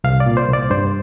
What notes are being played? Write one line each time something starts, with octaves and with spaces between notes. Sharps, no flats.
C2 F5
D5
A#2
C5
C2
D5
G2 C5